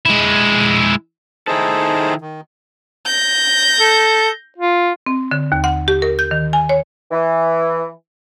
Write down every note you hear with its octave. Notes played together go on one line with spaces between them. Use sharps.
G#3 E4
D#3 D#4 E4 G#4 A4 C5
D#3
G6 A#6
A4
F4
C4
D3
D#2
F#5
G4
A#4
G6
D#3
G#5
C#5
E3